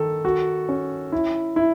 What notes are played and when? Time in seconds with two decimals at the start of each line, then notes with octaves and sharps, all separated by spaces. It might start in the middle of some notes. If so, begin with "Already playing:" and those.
Already playing: D#3 A4
0.25 F#4
0.69 C#4
1.12 E4
1.56 E4